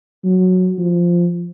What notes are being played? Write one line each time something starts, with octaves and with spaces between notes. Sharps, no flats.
F#3
F3